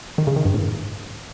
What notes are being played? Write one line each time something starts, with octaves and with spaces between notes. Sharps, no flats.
D#3
C#3
D#3
G2
A2